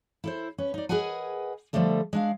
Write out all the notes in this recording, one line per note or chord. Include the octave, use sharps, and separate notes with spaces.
E4 A4 C5
C#4 B4
D#4 D5
G#4 A#4 B4 D#5 F#5 G#5
D3 F3 G3 A3 A#3 A4
G#3 D4 F5